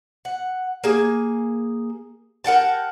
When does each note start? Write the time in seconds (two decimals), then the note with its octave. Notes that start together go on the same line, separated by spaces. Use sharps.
0.25 F#5
0.84 A#3 G#4
2.44 A#4 F#5 G5 A5